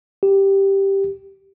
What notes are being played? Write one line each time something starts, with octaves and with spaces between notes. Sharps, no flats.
G4